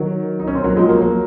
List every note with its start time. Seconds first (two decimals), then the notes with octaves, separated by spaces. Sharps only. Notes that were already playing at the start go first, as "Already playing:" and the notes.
Already playing: D#3 F#3
0.40 D#4
0.48 C#4
0.55 C4
0.64 F#3 A#3
0.76 F3 G#3
0.89 F#3 A#3
1.01 F#3 A#3